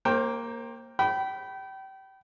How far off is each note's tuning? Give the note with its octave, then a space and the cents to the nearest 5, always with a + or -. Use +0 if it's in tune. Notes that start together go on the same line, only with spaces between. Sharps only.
A#3 +0 C5 +35 G5 +0
G5 -30 B5 +0